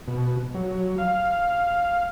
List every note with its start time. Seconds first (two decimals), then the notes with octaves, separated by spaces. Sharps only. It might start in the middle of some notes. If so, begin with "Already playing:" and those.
0.08 B2
0.54 F#3
0.98 F5